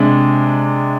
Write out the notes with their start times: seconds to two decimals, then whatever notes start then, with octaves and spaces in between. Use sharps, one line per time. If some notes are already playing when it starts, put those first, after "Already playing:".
Already playing: C3 G#3 D4